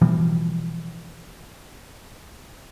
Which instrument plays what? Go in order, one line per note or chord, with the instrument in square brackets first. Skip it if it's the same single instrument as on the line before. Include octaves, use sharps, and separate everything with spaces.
[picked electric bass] B2 E3 F3 G3